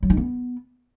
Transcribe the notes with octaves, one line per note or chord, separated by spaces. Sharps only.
F#3
D#4
B3